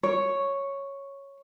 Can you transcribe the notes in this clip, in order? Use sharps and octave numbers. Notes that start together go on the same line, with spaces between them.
C#5